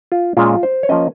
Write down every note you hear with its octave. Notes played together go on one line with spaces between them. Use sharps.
F4
A#2 G#3 C#4 F4
C5
C#5
F3 A#3 C#4 D#5